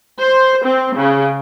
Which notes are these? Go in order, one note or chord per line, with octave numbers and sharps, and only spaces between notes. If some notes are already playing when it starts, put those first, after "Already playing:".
C5
C4
C#3